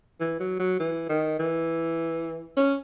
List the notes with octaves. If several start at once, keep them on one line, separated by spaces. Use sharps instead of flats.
E3
F#3
F#3
E3
D#3
E3
C#4